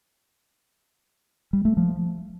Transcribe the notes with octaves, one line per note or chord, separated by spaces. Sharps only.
G3
A3
F3